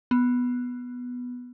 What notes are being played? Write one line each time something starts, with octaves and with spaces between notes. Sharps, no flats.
B3